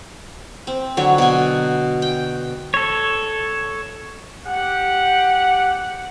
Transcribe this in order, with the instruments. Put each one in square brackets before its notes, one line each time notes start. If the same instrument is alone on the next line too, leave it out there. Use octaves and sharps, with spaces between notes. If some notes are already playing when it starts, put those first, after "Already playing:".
[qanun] C4
D3 F#3 C#5
B2 G#5
G5
[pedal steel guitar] A4 C#5
[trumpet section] G4 F#5